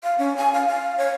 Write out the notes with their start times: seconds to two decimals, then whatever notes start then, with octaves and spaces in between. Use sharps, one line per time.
0.03 F5
0.19 C#4
0.37 G#5
0.53 F5
0.67 F5
0.98 C#5